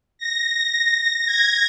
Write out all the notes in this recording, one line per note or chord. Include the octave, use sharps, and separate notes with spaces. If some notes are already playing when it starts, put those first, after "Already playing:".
A#6
A#6
G#6